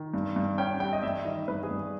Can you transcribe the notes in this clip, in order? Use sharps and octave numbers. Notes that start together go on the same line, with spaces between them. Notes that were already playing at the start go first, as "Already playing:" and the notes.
Already playing: D#3
G2
G2
C#4 G5
G3 G5
D#5
G2 E5
D#3 D#5
G2 B4
G#4
G2